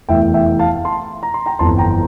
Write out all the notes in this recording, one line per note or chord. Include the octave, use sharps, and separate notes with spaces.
F1 E2 E3 E5 G5
E5 G5
F5 A5
A5 C6
A#5
C6
G5 A#5
G1 F2 E3 A5 C6
G5 A#5